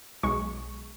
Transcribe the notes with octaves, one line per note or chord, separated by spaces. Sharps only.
B1 G#3 C#6